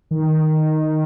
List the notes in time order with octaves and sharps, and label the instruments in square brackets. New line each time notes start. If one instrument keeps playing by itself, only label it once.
[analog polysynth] D#3